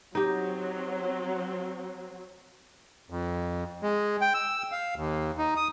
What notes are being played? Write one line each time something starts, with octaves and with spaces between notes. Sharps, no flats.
F#3 C4 D#4 G4
F2
G#3
G5
E6
F5
D#2
D#4
D#6